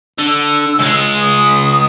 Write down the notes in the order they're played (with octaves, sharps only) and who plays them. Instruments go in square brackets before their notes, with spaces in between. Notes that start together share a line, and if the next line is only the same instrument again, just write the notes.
[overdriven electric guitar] D3 [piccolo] E6
[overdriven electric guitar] C#2 G#3
[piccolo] D#6